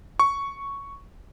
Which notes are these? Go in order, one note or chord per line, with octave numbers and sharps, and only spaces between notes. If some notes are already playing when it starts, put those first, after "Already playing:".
C#6